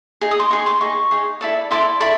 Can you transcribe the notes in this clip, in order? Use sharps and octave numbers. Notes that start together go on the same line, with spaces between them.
D#4 G#4
D#6
C6 D6
D#4 G#4 C#6
C6 D6
D#4 G#4 C#6
D#4 G#4
E4 A4 D5
E4 A4 D5 C6 D6
E4 A4 D5 B5 C#6